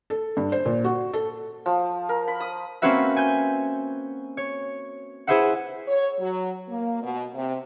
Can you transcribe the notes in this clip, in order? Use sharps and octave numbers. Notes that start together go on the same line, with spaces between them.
A4
G2
C5
A#2
F#4
A4
F3
A#4
B5
D#6
A#3 C4 C#4 F#4 B4 E5
G#5 G6
C#5
E4 G#4 B4 C5 E5 F#5
C#5
F#3
A#3
B2
C3